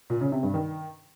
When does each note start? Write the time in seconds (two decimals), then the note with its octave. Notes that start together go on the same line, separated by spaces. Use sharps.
0.10 A#2
0.21 C#3
0.32 C3
0.43 G2
0.54 D#3